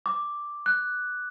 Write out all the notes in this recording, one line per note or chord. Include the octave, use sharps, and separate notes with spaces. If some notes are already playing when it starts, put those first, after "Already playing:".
D6
F#6